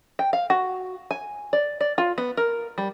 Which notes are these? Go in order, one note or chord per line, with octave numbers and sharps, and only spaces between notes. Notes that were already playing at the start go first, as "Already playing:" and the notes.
G5
F5
F#4
G#5
D5
D5
F4
B3
A#4
G3